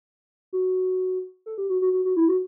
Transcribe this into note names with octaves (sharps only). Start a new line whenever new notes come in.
F#4
A4
G4
F#4
F#4
F#4
F#4
E4
F#4